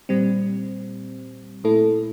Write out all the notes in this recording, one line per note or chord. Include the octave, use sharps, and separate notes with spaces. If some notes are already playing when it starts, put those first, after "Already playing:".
A#2 G3 C4
A#2 A3 E4 A4